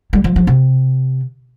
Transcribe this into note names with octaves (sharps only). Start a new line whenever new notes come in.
G3
F3
F3
C3